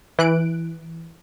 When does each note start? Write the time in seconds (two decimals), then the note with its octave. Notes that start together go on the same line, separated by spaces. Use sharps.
0.19 E3 F#6 D7